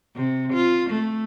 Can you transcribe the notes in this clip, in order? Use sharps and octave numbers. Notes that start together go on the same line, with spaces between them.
C3
F4
A3